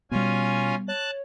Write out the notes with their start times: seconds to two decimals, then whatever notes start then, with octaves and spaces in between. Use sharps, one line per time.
0.11 B2 G3 B3 C#4 F4 G#5
0.88 C#5 A5 F#6